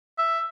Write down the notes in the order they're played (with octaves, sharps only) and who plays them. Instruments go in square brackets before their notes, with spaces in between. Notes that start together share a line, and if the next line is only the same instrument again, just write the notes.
[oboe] E5